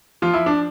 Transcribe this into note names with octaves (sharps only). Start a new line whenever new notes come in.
F3 F4
E4
D4